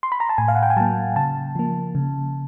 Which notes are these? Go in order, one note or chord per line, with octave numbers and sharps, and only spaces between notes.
C6
B5
A#5
A5
A2 G#5
F5
F#5
G5
G#5
F#3 A#3 A5
C#3 A5
F3 A#3
C#3